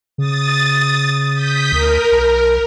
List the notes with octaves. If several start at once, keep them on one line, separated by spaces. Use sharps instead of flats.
C#3 D#6 A6
D#6 G6 B6
D2 A#4
B1